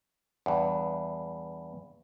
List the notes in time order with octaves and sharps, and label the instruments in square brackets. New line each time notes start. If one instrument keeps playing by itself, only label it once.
[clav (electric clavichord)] E2 G2